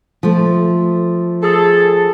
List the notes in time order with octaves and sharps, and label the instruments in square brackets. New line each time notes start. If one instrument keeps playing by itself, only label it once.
[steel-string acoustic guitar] F3 A3
[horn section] G#4 A4